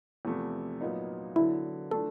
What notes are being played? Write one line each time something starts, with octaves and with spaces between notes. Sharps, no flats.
E2 C3 F3 A3
A#2 F#3 B3 D#4
D3 F#3 B3 E4
E3 A3 D4 F4 A4